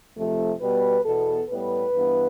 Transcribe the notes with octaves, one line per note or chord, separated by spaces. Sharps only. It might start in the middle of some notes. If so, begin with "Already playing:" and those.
F2 C3 F3 A3
B2 G3 B3 B4
E2 B2 B3 A4
A2 G3 B3 B4
G2 E3 B3